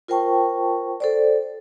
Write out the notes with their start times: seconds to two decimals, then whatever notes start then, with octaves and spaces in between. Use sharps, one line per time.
0.08 F4 A#4 C5 G5 A5 C#6
1.00 A4 C5 D5